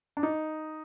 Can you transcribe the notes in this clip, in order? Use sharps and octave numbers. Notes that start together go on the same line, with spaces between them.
D4
D#4